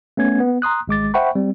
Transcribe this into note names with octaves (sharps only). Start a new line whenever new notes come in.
A3 B3 C#4 G#6
B3
A#5 C6 D#6 F#6
G#1 G#3 D6 A6
C5 E5 F#5 G5 B5 C#6
G3 C4